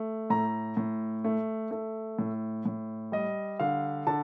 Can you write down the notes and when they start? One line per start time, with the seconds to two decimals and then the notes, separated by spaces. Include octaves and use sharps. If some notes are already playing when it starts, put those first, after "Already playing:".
Already playing: A3
0.30 A2 A#5
0.77 A2
1.24 A3
1.71 A3
2.19 A2
2.65 A2
3.12 G3 D#5
3.59 D3 F5
4.07 D3 A5